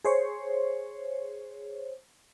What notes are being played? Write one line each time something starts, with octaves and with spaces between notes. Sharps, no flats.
G#4 C5 C#5